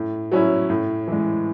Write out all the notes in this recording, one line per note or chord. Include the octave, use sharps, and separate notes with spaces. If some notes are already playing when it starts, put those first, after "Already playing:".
Already playing: A2
F#3 C#4 E4
A2
E3 G#3